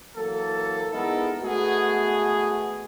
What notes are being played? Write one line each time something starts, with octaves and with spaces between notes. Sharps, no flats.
E3 F#3 A#3 A4
G#3 B3 D#4 E4 A4 A#4
G#3 A3 B3 F#4 G#4